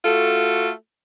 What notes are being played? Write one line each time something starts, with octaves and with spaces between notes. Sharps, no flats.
A3 F4 F#4 A4